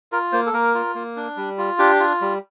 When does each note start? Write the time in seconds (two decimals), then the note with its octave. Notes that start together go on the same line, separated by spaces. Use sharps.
0.12 F4 A#4
0.33 A#3 C5
0.46 A4
0.53 A#3 A#4
0.75 F4
0.95 A#3
1.16 D4
1.37 G3
1.58 F4
1.79 D4 G4
2.00 F4
2.21 G3